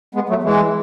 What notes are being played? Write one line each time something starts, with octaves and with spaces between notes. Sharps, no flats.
G#3 B3
F#3 A3
E3 G#3